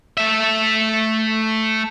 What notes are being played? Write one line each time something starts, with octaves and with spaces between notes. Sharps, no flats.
A3 E5